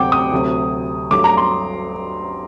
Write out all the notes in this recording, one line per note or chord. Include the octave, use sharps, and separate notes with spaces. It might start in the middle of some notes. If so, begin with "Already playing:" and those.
Already playing: D2 C3 F#3 C4 F#5 G5 D6
D#6
D2 C3 F#3
G2 F#3 A3 D6
A#5
C6